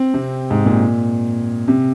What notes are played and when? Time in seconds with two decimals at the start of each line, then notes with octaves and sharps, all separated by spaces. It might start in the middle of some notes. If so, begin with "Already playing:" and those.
Already playing: C4
0.14 C3
0.51 G#2
0.66 A#2
1.68 C3